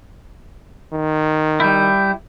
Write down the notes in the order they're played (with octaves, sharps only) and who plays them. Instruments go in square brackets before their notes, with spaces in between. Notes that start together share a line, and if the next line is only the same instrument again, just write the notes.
[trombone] D#3
[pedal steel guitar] G3 E4 [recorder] G6